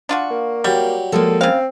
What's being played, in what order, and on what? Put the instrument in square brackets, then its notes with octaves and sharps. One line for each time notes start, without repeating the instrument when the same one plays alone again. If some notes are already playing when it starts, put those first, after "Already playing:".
[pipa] D4 F4 F#4
[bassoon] A#3
[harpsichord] F#3 G4 [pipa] G3
[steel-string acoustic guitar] F3 G#3 A#3 [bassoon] A4
[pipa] C#3 F5 [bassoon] C4